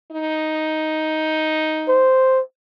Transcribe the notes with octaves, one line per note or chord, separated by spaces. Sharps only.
D#4
C5